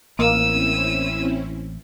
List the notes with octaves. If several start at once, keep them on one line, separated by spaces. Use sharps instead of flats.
A1 A#3 C4 C#4 E4 E6 D#7